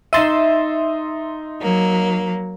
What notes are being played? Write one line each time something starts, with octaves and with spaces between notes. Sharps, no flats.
D#4 E5 C6 E6 A6 D#7
F#3 A#3